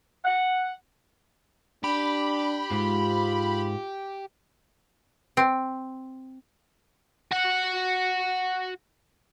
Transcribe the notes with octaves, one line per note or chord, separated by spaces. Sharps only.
F#5
D4 G4 B5
G#2 G#3 F4
C4
F#4 F#5